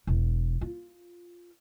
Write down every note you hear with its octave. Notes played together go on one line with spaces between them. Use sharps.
E1
F4